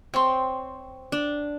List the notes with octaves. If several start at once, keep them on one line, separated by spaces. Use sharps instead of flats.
C4 C#5 C6
D4